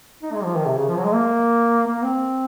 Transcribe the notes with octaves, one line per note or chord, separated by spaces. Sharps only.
D#4
G#3
F3
D#3
C3
C#3
F3
F#3
G#3
A#3
A#3
C4